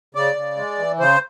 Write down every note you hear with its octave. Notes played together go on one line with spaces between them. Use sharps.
C#3 D5
C#3
G#3
E3
C#3 C5